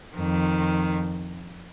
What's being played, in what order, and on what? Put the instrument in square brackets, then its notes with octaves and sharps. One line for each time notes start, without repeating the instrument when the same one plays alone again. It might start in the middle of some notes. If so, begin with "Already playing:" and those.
[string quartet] F2 D#3